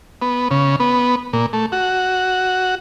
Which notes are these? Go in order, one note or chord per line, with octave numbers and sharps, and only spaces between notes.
B3
C#3
B3
A#2
A3
F#4